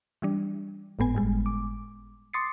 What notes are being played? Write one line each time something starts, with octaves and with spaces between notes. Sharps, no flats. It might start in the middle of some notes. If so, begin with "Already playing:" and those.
E3 G3 D4
G#1 A2 B3 G#5
G1 G3 G#3
D6
C6 D6 D#6 A6 C7 C#7